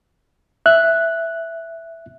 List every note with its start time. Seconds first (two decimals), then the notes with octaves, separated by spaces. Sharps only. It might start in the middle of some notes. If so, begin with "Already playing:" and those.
0.66 E5 F#6